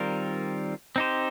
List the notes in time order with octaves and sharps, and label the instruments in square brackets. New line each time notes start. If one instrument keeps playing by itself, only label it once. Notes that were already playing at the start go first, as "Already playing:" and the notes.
Already playing: [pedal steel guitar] D#3 G3 C4 F4 A#4
C4 D#4 G4 C5